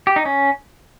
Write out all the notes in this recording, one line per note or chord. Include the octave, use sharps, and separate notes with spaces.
G4
D#4
C#4